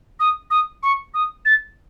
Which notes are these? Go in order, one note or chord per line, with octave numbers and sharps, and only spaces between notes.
D#6
D#6
C#6
D#6
A6